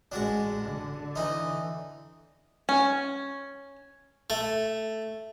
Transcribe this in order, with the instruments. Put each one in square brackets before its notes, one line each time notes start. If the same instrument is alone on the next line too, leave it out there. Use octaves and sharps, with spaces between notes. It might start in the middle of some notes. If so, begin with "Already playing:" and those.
[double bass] A1 G#3 [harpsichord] D4 F#4
[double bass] D3
[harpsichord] E3 D#4
[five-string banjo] C#4
[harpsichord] A3